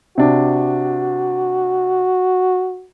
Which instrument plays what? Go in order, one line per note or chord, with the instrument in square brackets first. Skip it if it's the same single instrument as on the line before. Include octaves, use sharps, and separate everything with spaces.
[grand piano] C3 D4 [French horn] F#4